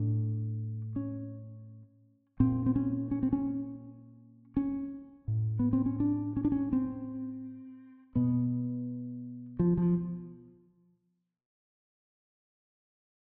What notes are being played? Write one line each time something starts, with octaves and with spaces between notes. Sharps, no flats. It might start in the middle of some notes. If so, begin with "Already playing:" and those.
Already playing: A2 D4
C#4
A#2 C4
C4
C#4
C#4
C4
C#4
C#4
A2
B3
C4
C#4
D4
C#4
D4
C#4
C4
B2 B3
F3
F3